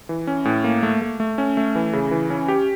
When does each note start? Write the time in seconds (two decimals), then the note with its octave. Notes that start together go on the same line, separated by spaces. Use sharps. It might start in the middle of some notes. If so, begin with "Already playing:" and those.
0.09 E3
0.27 C#4
0.45 A2
0.64 A#3
0.83 A3
1.02 A3
1.20 A3
1.38 C#4
1.57 A3
1.75 E3
1.93 C#3
2.11 E3
2.30 C#4
2.48 G4